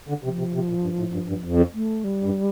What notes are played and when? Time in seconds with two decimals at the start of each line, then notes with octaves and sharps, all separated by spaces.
0.09 D3
0.23 C3 F3
0.38 C3
0.54 C3
0.69 A#2
0.83 G2
0.99 A2
1.13 G2
1.29 G2
1.44 F2
1.74 A3
2.04 G3
2.24 G2